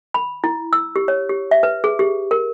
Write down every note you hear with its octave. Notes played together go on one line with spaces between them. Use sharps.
B5
E4
E6
G4
C#5
G4
E5
B4
G#4
G4
A#4